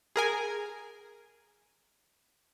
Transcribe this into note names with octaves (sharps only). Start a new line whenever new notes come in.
G#4 A#4 G#5